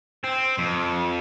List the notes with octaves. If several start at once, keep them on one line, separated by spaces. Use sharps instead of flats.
C4
F2